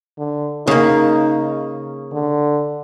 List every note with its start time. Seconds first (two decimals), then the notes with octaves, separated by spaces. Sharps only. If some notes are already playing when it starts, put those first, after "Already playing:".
0.18 D3
0.67 C#3 A#3 D#4
2.13 D3